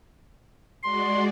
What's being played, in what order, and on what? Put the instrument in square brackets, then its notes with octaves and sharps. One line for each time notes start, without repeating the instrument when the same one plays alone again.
[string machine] G#3 F#4 D5 [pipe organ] C6